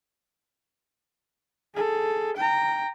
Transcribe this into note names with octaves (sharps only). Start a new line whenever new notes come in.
G#4 A4
G5 A#5